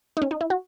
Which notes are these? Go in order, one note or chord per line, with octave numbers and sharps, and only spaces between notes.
D#4
C#4
D#4
E4
F#4